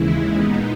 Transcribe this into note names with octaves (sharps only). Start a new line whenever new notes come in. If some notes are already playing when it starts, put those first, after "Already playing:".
Already playing: D#2 C#3 E3 G#3 E4
A#2 G#3 B3 D#4